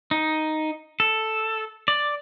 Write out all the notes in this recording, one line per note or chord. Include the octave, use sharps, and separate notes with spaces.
D#4
A4
D5